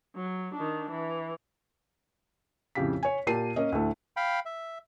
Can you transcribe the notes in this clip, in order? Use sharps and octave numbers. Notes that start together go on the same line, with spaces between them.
F#3
D#3 D4
E3
F2 A2 C#3 G4 F5 B6
C#5 G#5
A#2 G4 A#4 A5 C7 D#7
A#3 C#4 D#5
D2 A2 A3
F5 G5 B5
E5